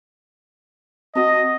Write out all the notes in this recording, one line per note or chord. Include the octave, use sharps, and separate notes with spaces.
C4 F#4 D#5 F#5